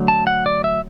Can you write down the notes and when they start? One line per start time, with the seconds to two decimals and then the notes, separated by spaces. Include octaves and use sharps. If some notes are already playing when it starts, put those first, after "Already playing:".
Already playing: D3 F#3 A3
0.08 A5
0.27 F#5
0.46 D5
0.64 E5